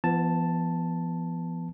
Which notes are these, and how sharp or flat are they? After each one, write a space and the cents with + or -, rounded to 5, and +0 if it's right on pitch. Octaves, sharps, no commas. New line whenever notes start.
F3 -45 B3 +0 A5 +0